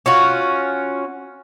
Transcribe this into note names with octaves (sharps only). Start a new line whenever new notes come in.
C#4 F4 F#4